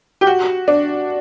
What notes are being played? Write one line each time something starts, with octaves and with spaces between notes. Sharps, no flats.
G4
F#4
D4